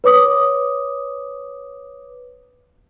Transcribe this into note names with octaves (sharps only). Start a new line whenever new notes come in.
B4 C#5 D6 D#6